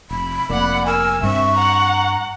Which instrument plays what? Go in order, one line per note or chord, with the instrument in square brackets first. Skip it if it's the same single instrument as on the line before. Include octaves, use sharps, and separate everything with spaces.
[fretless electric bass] F1 [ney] B5
[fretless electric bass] F1 A#3 [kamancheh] D5 F#5
[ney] A#4 [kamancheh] G#5 E6
[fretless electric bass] G2 C4 [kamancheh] E5 [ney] C#6
[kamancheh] F#5 A#5